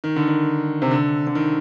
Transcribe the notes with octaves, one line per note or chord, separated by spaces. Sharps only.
D#3
D3
D#3
C3
D3
D3
D#3